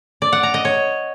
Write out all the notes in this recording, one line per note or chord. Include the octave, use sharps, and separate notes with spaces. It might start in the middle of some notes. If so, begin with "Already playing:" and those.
D5
F#5
A#5
D#5
C#5